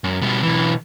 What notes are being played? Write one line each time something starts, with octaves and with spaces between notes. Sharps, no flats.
F#2
B2 G3
B1 E3